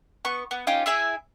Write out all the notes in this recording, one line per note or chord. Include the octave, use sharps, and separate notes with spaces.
B3 C#6
B3
C#4 D#4 F4 G4
E4 G#4 E5 G#5